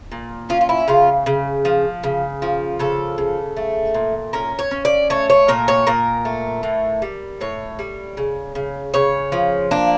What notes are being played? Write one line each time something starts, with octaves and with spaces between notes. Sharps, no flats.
A#2
C#4 F4
F4
E4
C#3 F4
C#3
F3
C#3
F3
C#3 A4
C#3
A3
A#2
C#4 A#4
C#5
C#4
D5
A3 C#5
C#5
A#2 A#4
C#5
A#2 A#4
A3
A2
G3
A2 C#5
G3
C#3
C#3
C#3 C#5
F3
A#3 D4